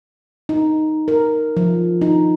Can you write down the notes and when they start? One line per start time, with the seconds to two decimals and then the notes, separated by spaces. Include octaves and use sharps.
0.49 D#4
1.08 A#4
1.57 F3
2.01 D#4